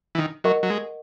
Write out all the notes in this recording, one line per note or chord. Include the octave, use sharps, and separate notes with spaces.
E3
D#3
F#3 A#4 D#5 F#5 C#6
F#3
G#3